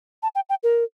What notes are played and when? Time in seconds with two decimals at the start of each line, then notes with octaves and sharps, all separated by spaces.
0.23 A5
0.35 G5
0.49 G5
0.63 A#4